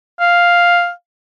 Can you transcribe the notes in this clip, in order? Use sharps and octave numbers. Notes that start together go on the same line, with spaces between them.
F5